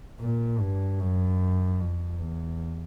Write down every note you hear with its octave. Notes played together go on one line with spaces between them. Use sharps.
A#2
G2
F#2
F2
E2